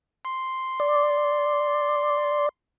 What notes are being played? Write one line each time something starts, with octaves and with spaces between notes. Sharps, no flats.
C6
D5